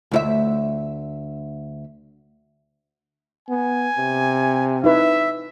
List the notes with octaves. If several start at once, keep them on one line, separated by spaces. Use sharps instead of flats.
D2 E4 E5
B3 G#5
C3
D#4 E4 B4 E5